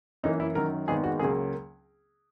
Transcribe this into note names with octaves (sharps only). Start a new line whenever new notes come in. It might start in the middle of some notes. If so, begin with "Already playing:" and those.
F#2 E3 A#3 D#4
E4
F#2 D#3 F#3 A#4
G#1 G#2 D#3 G#3 B3 G#4
F#4
C#2 C#3 F#3 A#3 G#4